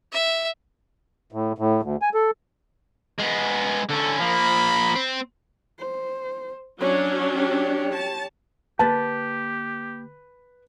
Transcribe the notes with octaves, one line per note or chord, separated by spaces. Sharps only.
E5
A2
A2
D2
G#5
A4
G#3 B3
D3 C#4 A4
F3 A#3 B5
C4
C5
F#3 C#4 D4 C#5
G4 C#5
A5
D3 A#3 G4 B4 A5